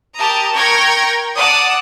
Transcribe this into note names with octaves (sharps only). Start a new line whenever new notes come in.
G4 A#4 A5 A#5 D#6
A#4 G5 C#6 G#6 A#6
D5 F#5 A5 D6 D#6